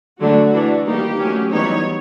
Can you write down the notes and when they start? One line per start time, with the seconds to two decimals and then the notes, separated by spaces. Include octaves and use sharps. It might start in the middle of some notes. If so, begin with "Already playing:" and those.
0.20 D3 F#3 A3 D4 F#4
0.53 E3 A3 D4
0.86 D#3 G3 A#3 D#4 G4
1.19 F#3 A3 C#4
1.52 E3 G3 B3 D#4 C#5